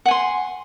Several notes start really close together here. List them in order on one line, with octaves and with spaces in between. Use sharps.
F#5 G#5 C6